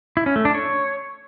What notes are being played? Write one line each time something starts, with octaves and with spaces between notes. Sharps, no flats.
E4
C#4
A3
D4
C#5